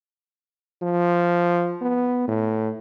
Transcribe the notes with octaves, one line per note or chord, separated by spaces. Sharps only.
F3
B3
A2